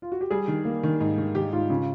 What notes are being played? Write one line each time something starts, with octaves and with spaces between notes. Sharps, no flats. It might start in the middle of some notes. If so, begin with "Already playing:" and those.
F4
F#4
G4
G3 G#4
D#3
A#3
D#3
G#2
D#3
D#3 G4
G#2 F4
C#3 F4